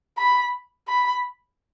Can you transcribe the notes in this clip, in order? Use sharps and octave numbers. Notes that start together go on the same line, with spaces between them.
B5
B5